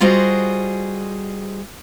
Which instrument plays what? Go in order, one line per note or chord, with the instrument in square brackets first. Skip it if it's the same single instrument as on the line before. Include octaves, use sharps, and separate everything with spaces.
[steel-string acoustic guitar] G3 F4 F#4 G#4 C5 D#5